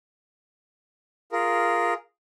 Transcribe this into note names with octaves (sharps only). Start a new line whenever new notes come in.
F4 G#4 A#4